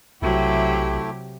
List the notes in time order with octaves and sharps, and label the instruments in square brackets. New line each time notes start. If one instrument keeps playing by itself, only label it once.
[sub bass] B1 [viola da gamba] C3 F#3 [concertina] A3 E4 [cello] G4